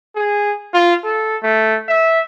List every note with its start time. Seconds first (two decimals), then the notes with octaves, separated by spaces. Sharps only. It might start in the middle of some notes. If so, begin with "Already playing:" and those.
0.15 G#4
0.74 F4
1.04 A4
1.43 A3
1.88 E5